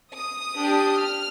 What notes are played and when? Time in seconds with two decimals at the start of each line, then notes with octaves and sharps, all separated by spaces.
0.13 D#6
0.55 D4 G4
0.98 F6